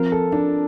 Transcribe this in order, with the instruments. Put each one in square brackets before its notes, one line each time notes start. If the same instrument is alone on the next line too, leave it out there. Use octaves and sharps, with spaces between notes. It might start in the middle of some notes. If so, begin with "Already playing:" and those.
Already playing: [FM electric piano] F3 C4 F4 [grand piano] A#4
[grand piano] A4
D4